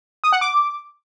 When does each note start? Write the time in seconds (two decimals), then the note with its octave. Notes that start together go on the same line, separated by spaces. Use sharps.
0.24 D#6
0.32 F#5
0.41 D6